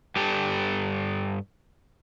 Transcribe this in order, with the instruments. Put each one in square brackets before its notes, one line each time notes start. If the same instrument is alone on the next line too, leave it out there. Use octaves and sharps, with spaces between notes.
[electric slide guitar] G2 G4 A4